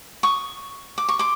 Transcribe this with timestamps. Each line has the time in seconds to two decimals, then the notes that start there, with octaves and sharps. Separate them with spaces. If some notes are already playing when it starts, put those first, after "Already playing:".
0.23 C#6 D#6
0.98 D6
1.09 C#6
1.19 C6 D6